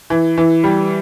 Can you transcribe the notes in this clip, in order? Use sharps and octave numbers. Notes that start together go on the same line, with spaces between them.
E3
E3
G3